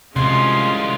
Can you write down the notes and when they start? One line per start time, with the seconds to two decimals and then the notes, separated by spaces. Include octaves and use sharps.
0.16 C2 C3 F3 G#3 C#4 F4 C6